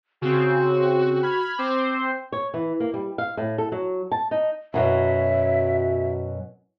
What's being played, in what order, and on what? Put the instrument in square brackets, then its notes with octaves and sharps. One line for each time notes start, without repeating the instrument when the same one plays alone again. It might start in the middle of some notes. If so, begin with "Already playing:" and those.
[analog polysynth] C#3 C4 [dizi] F#4
[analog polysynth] B5 F6 G#6
[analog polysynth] C4 C5 [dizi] D6
[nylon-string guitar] C#5
E3
A#3
G3
F5
A2
A4
F#3
A5
D#4
[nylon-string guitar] F#2 B2 F#3 [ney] E5